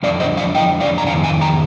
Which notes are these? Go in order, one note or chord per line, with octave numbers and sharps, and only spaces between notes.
F2 D3 F3 D5 F5
C5 D#5
D5 F5
D#5 G5
D5 F5
A#5
F2 D#3 F5 G#5
F5 G#5
G5 A#5